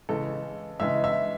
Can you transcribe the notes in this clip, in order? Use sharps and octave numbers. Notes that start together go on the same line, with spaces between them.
C#3 E3 G#3 A4
C#3 E3 G#3 E5
E5